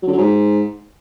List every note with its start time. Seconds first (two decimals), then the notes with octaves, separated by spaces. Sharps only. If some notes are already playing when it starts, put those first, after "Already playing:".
0.03 F#3
0.08 D3
0.13 F#3
0.18 G#2